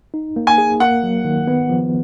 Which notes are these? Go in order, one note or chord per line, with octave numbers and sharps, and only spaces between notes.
D#4
A#3
G#5
G#4
A#3 F#5
F#3
D#3
B3
F3